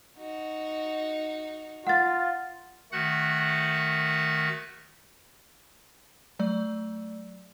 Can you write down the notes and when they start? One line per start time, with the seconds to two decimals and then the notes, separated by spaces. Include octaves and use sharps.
0.17 D#4 F#4
1.87 F4 F#5 A6
2.92 D#3 A3 F#4 F#5 F#6
6.39 F#3 A3 D5